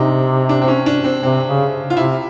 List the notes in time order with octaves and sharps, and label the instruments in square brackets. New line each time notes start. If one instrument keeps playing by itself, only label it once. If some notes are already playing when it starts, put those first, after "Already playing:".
Already playing: [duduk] C3 [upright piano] D4 D#4
[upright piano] D4
C4
C#4
D4
C4
[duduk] C3 [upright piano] C4
[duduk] C#3
[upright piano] F4
[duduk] C3 [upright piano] E4